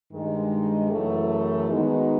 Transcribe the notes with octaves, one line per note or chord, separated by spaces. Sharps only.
G2 D#3 G#3
F#2 C#3 E3 A3
D#3 G#3 B3 D#4 F#4